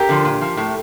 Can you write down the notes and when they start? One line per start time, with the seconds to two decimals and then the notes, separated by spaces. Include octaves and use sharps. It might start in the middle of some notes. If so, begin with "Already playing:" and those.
Already playing: G4 A#4
0.09 D3 F3
0.25 A#2
0.41 F3
0.57 A2